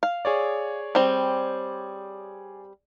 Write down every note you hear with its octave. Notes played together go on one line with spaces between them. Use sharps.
F5
G#4 C#5 D5
G3 C4